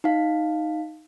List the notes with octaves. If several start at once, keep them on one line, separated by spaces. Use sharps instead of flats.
D#4 F5